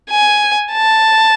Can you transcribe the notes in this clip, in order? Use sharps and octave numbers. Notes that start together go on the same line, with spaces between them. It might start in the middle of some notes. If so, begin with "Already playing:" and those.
G#5
A5